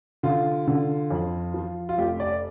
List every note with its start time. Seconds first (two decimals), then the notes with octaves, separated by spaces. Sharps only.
0.23 D3 F4
0.67 D3
1.10 F2
1.54 F3
1.89 F4
1.98 F1 G4
2.20 D5